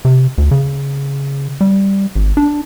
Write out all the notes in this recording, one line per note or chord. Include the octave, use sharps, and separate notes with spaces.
C3
D2
C#3
G3
G#1
D4